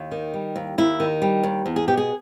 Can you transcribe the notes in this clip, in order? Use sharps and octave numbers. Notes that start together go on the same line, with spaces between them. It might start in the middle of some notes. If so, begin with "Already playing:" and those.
Already playing: D#2
D#3
G3
D#2
D#2 E4
D#3
G3
D#2
E2
G#4
B2 G4
G#4